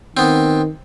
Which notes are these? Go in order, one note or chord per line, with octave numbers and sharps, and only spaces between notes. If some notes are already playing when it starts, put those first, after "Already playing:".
D#3 B3 C4